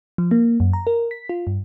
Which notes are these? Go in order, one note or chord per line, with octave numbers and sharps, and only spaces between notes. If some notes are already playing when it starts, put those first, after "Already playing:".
F3
A#3
F#2
A#5
A#4
B6
F4
G2